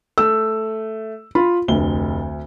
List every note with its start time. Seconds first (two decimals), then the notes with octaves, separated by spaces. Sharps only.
0.18 A3 E6
1.35 F4 B5
1.68 F1 D2 G7